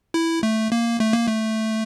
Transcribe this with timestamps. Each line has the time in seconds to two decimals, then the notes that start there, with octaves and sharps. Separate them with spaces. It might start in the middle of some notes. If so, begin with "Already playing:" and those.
0.14 E4
0.43 A3
0.72 A#3
1.00 A3
1.13 A#3
1.27 A3